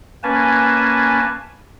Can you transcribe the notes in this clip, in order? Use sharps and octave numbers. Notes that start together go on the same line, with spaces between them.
A#3 C#4 B4 G#5 A5